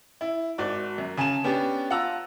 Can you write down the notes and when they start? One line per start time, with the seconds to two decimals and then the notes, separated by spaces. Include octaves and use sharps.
0.21 E4
0.58 G#1 F#4 D5 D6
0.98 F#2
1.17 C#3 G#5 A5 E7
1.44 B3 C#4 D4 G4
1.90 F4 F#5 A5 A#5 E6